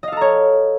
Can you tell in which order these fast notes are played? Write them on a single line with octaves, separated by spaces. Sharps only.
D#5 F5 A4 A#5 C#5